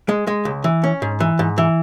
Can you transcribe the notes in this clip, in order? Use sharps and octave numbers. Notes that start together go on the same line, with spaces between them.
G#3
G#3
C#2
E3
C#4
G#2
E3
G#2
E3